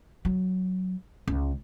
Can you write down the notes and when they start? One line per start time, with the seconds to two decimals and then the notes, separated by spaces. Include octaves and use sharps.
0.25 F#3
1.28 C#2